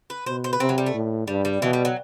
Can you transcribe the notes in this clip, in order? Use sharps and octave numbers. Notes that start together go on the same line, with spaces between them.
B4
B2 C5
C5
B4
C3 C4
F#3
G3
A3
A2
G2 G3
G3
B2 E3
G3
F#3